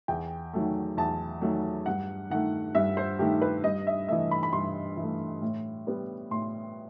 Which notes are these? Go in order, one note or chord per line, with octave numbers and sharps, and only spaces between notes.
E2 G5
D#3 F#3 A3
E2 A5
D#3 F#3 A3
G2 F#5
D#3 A3 F#5
G2 E5
C5
D#3 A3 G4
B4
G2 D#5
E5
E3 A3 E5
B5
B5
G2 C6
E3 A3
A2
G3 B3
A2 C6